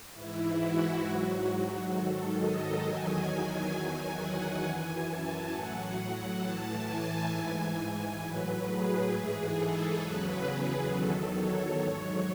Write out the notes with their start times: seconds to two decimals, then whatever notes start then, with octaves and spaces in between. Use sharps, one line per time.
0.14 G#2 E3 E4
0.59 F#4
1.03 G#2 F#3
1.92 G#2 D#3 F#3 A4
2.37 D#5
2.81 E2 D#3 F#3 G#5
3.72 E2 D#3 F#3
4.16 F#5
4.60 F#2 E3 G#5
5.06 A5
5.50 A2 F#3 F#5
6.40 A2 E3 A5
6.85 G#5
7.29 G#2 E3
7.74 G#5
8.19 A2 F#3 B4
8.64 G#4
9.09 G#2 E3
9.53 A4
9.98 E2 C#3 F#3 B4
10.43 G#4
10.87 E2 D#3 F#3 A4
11.32 C#5
11.77 G#2 F#3